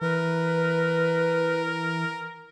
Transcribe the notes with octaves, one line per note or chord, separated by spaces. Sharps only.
E3 A#4 B4